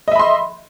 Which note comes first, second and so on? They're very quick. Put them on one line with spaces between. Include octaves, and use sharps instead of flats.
D#5 E5 B5 C6